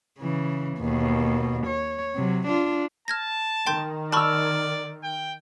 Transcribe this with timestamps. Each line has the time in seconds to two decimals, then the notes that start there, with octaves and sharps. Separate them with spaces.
0.19 C#3 E3
0.79 D#2 B2
1.67 C#5
2.16 C3 F#3
2.48 D4 F4
3.08 A5 F6 G#6 A#6
3.67 D#3 G5 C6 G6
4.12 D5 A5 B5 C#6 E6 F6
5.03 G5